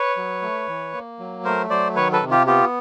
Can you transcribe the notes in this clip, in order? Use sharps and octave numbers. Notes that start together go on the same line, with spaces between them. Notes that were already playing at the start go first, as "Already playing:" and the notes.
Already playing: B4 C#5
F#3
A3
E3
A#3
F#3
A3 A#4 C5
F#3 C5 D5
D#3 B4 C#5
A4 B4
C3
F4 G4
B3 F4 G4